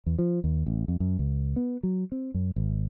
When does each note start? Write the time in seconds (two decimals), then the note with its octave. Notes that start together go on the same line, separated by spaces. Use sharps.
0.06 E2
0.19 F3
0.44 D#2
0.66 A1
0.88 F2
1.00 F#2
1.19 C#2
1.56 B3
1.83 F#3
2.12 C4
2.34 F#2
2.56 G#1